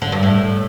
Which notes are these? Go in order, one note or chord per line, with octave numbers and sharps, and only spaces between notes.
D3
G2
A2